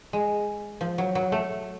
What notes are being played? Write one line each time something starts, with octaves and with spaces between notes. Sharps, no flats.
G#3
F3
F#3
F#3
A3